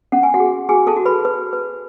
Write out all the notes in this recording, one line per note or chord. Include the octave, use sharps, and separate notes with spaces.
C#4 F#5
G#5
F#4 F#5
G#4
F#4 G#4 G#5
A4 A5
F#4
B4 B5
B4
B4